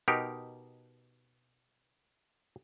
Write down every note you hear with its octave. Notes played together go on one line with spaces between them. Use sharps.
B2 D#4 G4 A#4